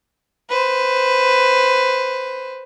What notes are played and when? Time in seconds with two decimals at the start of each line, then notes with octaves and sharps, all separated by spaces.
0.50 B4 C5